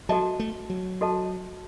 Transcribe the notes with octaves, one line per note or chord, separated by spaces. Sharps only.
F#3 F#4 A4 D#5 A5
A3
F#3
F#4 A4 D#5 A5